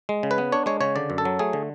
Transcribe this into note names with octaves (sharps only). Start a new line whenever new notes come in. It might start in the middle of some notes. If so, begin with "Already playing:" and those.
G#3
C#3
B4
B3
D4 C#5
G#3 C#5
C#3 C#5
D3 D5
F#2
A4
F#3
A3 G#4
D3